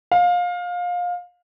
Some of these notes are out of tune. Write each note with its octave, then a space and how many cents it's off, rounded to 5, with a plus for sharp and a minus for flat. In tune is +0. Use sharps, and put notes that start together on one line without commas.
F5 +25